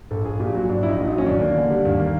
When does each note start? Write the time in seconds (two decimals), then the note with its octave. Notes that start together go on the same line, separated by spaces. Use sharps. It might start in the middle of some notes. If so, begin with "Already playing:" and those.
0.11 A#1 A4
0.25 A#1 G#4
0.40 A#2 G4
0.54 F#3 F#4
0.69 A#1 D4
0.83 A#1 E4
0.88 D#4
0.98 A#2
1.08 F#3 D#4
1.18 C#4
1.26 D#2 D4
1.41 A#3
1.56 D3
1.70 G3
1.85 D#2
2.00 A#3